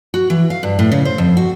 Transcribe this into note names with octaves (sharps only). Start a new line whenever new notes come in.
F#4
E3
F5
G2
A2
C#3
C5
F2
F#4